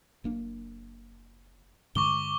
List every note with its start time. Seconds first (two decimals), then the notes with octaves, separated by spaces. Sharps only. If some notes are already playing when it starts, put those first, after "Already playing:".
0.24 F#1 A#3 D4
1.95 G2 D3 G#3 C#6 D6 G7